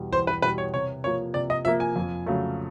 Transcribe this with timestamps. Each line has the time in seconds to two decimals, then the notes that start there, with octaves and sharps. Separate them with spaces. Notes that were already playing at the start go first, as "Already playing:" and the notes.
Already playing: E2 B2 G3
0.12 E2 C5
0.27 B4
0.42 B2 G3 B4
0.58 C#5
0.74 C3 C#5
1.04 F3 A#3 C#5
1.34 C3 D5
1.50 D#5
1.65 F3 A#3 E5
1.80 G#5
1.96 F2
2.26 C#3 F#3 A3